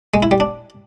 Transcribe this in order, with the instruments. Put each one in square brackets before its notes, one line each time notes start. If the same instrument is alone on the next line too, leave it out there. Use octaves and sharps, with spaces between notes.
[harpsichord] G#3
E4
G3
D4